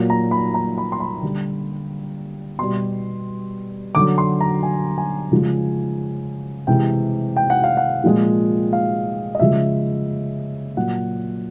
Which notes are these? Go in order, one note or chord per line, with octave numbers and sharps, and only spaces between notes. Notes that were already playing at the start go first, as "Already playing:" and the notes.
Already playing: A#2 F#3
A#5
B5
A#5
B5
C6
B5
D3 G3
B2 G3 C6
D3 F#3 D6
C6
A#5
G#5
G#5
C#3 F3 G#3
C3 E3 G#3 G5
G5
F#5
F5
F#5
A#2 F3 G#3
F5
D#5
C#3 F3 G#3 E5
A#2 F#3 F#5